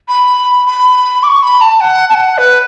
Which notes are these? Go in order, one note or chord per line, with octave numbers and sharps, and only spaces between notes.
B5
B5
D6
C#6
B5
A5
F#5
A5
F#5
B4